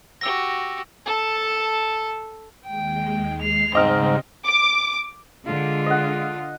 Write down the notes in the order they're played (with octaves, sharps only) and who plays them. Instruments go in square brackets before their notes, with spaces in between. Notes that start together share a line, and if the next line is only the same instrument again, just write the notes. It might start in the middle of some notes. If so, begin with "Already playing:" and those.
[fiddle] F#4 G4 [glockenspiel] E6 A#6
[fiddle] A4 A5
[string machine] D#2 G#3 [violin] G5
[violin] C7 F7
[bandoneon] G#2 [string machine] C#3 G3 [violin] C4 [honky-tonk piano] D#5 F6
[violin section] D6
[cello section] D3 [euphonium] G#3 [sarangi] F4
[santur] D#5 F#5